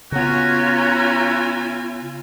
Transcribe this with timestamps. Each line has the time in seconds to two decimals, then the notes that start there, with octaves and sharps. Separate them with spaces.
0.12 C#3 B3 C#4 F4 F#4 G#5 A#5